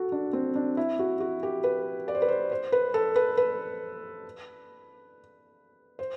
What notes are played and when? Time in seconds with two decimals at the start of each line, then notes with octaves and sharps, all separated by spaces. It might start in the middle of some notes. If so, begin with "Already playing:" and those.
Already playing: F#4 A4
0.12 D4
0.33 C4
0.55 D4
0.77 E4
0.99 F#4
1.20 F#4
1.43 G4
1.64 B4
2.08 D5
2.15 C5
2.22 B4
2.28 C5
2.52 C5
2.72 B4
2.94 A4
3.16 B4
3.37 B4
5.99 C5